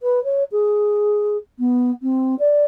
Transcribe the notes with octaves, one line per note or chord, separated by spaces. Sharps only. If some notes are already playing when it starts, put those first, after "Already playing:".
B4
C#5
G#4
B3
C4
D5